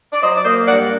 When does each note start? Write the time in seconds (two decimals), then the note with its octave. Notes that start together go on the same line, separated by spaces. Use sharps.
0.13 D5
0.23 F#3 C5 D#5
0.37 D5
0.45 A#3 C5 D#5
0.68 G2 D5 F#5